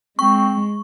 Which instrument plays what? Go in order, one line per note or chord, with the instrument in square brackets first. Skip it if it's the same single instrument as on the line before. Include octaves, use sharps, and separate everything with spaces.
[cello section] G#3 [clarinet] C4 [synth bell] C#6